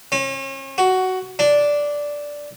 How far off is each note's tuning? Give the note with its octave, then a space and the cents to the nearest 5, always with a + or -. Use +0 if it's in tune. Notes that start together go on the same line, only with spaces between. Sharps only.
C#4 -40
F#4 +10
D4 -5